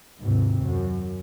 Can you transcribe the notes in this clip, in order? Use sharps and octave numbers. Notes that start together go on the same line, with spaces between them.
D#2 G#2 C3
F#2